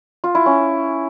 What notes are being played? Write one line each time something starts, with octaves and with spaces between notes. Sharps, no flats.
F4
E4
C#4